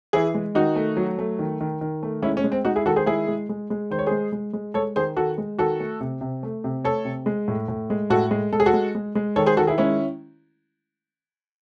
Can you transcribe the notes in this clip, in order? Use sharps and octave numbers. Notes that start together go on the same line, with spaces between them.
E3 E4 G#4
G#3
D#3 D#4 F#4
A3
F#3
A3
D#3
D#3
D#3
A3
G#3 C#4 E4
C#4
G#3
C4
G#3 D#4 F#4
E4 G#4
D#3 F#4 A4
G#4 C5
G#3 E4 G#4
G#3
G#3
G#3
D#3 C5
C#5
G#3 G#4 C5
G#3
G#3
G#3 A4 C#5
D#3 G#4 C5
D#3 F#4 A4
G#3
D#3 F#4 A4
A3
C3
C3
A3
C3
A3 A4 C#5
C3
G#3
A2
A2
G#3
A2 F#4 A4
G#3
G#3 A4
G#4
F#4 A4
G#3
G#3
G#3
D#3 A4 C#5
G#4 C5
D#3 F#4 A4
E4 G#4
G#3 C#4 E4